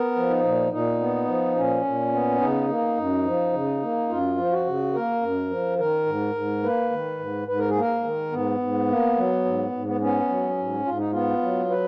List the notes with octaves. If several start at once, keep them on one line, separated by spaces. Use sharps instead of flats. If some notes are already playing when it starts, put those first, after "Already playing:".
Already playing: B3 A#4
F3
D#4
A#2
A#2 D#4
B3
F3
A#2 C#4
A#2
B3
C#3 D#4
A#3
F#2
F3
C#3
A#3
F#2 F4
F3
F#4
C#3
A#3 A#4
F#2
F3
D#3 A#4
G#2
G#2
A#3 B4
D#3
G#2
G#2 B4
A#4
G#4
A#3 A#4
D#3
G#2 B3
G#2
A#3
F#3
G#2
G#2
B3
B3 C#4
F#3
G#2
G#2 F4
D#4
B3 F4
F#3
B4